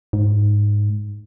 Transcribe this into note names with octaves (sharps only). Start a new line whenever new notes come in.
G#2